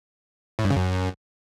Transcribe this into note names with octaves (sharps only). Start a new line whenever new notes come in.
A2
G2
C#3
F#2